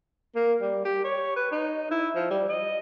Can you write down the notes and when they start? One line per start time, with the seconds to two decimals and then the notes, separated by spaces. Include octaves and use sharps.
0.35 A#3
0.61 G3
0.85 G4
1.04 C#5
1.36 B4
1.51 D#4
1.91 E4
2.15 F3
2.30 G3
2.49 D#5